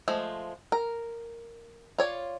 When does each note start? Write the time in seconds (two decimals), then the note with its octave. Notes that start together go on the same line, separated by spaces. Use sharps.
0.08 F3 G#3 A3
0.72 A#4
1.98 F4 C#5 D5